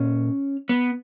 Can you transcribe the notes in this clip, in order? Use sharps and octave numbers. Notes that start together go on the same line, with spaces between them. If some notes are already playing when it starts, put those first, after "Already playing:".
Already playing: A#2 C#4
B3